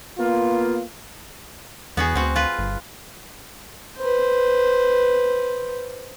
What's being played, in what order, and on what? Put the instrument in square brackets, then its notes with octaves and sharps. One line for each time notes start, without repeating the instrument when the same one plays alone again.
[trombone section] A#3 B3 F4
[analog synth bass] E2 [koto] B3 F#4 G#4
[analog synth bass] D2 [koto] C4 F#4
[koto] F4 B4
[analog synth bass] G1
[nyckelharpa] B4 C5